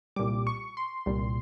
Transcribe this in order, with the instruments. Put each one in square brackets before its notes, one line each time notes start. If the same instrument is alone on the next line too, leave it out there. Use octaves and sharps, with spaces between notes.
[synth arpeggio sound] C2 A#2 G3 D6
C#6
C6
C2 A#2 G3